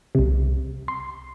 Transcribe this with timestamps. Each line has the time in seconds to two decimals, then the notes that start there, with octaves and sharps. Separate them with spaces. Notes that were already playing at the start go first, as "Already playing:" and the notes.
0.15 C2 C3
0.88 C6